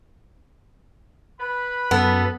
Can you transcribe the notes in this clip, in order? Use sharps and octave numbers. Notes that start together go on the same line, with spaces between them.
B4 B5
F#2 B3 A4